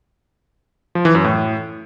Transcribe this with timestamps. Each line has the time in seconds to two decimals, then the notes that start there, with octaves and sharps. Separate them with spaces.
0.95 F3
1.05 E3
1.15 F#2
1.24 A2